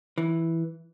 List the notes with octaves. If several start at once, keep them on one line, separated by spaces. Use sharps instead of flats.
E3